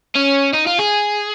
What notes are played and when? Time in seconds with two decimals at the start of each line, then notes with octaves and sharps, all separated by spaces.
0.15 C#4
0.53 D#4
0.66 F4
0.79 G#4